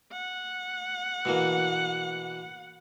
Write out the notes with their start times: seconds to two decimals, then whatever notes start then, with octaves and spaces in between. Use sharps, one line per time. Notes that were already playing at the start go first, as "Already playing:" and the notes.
0.12 F#5
1.25 B2 E3 A#3